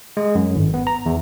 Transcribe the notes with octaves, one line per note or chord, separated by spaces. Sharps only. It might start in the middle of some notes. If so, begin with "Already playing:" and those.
G#3
F#2
G#1
B3
A#5
E2